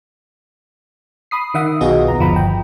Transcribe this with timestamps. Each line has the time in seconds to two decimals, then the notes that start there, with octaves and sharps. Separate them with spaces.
1.31 B5 D#6 C7
1.54 D#3 E5 F#5 D#6
1.81 B1 B3 F4 F#4 G#4 D#5
2.08 D#2 A#5
2.20 G1 F3 A#5 B5
2.36 G5